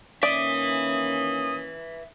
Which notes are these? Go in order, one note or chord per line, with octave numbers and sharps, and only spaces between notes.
D#3 A#3 C#4 B4 D5 E5 D#6